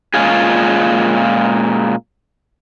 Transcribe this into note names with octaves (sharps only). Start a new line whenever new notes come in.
A#2 G#3 C#4 F4 G#4